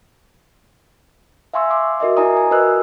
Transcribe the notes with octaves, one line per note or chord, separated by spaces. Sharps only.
E5 F5 G#5 C6 C#6 E6
C6 D6
F#4 A#4 D#5 E5
E4 D5 G#5 A#5 D#6
G#5
F#4 A#4 B4 D#5 E6 F#6